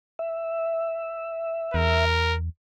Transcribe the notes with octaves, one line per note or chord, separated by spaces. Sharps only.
E5
E2 A#4